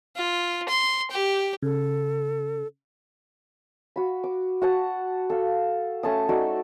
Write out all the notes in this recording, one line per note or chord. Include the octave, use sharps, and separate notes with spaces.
F4
C6
G4
C#3 A4
F#4 B5
D6
F#4 F#5 A5
A4 F5
A3 C#4 A5 D#6
D#4 F#4 A4 D5